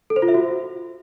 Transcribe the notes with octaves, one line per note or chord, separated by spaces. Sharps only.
A4
C5
F4
E5
F#4